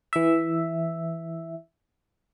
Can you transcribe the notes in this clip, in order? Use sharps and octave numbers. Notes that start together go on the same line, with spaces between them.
E3 E5